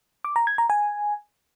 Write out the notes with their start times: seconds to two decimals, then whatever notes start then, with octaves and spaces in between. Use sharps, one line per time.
0.24 D6
0.36 A#5
0.47 G#6
0.58 A#5
0.70 G#5